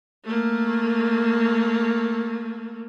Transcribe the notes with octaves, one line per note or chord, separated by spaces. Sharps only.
A3 A#3